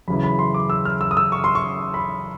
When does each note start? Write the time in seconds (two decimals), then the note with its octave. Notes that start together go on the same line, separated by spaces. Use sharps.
0.08 F#2 C#3 E3 B5
0.24 B5
0.39 C6
0.54 D6
0.70 E6
0.85 F6
1.01 E6
1.11 D#6
1.17 E6
1.32 C#6
1.44 C6
1.55 C#6
1.94 B5